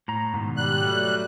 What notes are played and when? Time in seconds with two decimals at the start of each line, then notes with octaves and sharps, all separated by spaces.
0.08 A2 A#5
0.34 G#2 B2 D#3
0.57 G3 F#6
0.81 F#3 A3